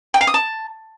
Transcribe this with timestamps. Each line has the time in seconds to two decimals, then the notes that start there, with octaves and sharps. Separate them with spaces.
0.14 G5
0.21 F5
0.27 D#6
0.34 A5